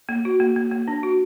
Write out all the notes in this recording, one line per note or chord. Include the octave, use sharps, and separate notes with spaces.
A#3
F#4
A#3
A#3
A#3
D4
F#4